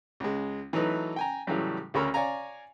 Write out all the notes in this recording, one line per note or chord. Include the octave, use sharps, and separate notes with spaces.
C#2 G#3
E3 F#3 A3 D#4 B4
G5 G#5 A#5
A2 C#3 E3 F#3 G3
D2 C#3 C#4 A#4 B5 E6
C#5 D5 F5 G#5 A#5